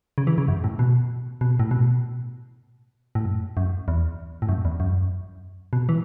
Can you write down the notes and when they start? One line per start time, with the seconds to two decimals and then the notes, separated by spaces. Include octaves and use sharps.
0.18 C#3
0.27 E3
0.38 C#3
0.48 F#2
0.64 A2
0.79 B2
1.41 B2
1.60 A2
1.71 B2
3.15 A2
3.25 F#2
3.57 F#2
3.88 E2
4.42 A2
4.49 F#2
4.65 E2
4.80 F#2
5.73 B2
5.89 E3